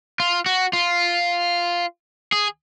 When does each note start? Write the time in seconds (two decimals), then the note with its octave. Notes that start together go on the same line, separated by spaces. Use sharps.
0.20 F4
0.46 F#4
0.73 F4
2.32 G#4